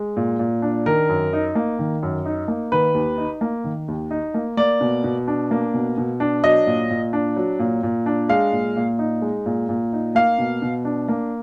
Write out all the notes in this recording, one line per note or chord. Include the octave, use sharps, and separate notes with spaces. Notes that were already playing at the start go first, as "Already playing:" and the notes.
Already playing: G#3
A#2
A#2
D4
D#3 A#4
F#2
D#4
A#3
D#3
F#2
D#4
A#3
D#3 B4
D#2
D#4
A#3
D#3
D#2
D#4
A#3
A#3 D5
B2
B2
D4
A#3
B2
B2
D4
F#3 D#5
A#2
A#2
D4
F#3
A#2
A#2
D4
G#3 F5
A#2
A#2
D#4
G#3
A#2
A#2
D#4
A#3 F5
B2
B2
D4
A#3